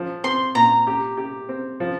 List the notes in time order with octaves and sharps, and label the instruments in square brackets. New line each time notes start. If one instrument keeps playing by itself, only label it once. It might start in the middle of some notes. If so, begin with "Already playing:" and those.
Already playing: [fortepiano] F3
[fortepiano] C4 [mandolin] C6
[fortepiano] A#2 [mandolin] A#5
[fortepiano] G4
G4
C4
F3